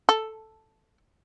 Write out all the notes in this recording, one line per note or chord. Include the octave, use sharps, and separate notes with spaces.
A4